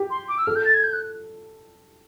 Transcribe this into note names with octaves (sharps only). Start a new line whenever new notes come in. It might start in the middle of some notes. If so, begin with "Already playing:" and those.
Already playing: G4
C6
D6
E6
A4 F6
G6
A6
G#6
G6
F#6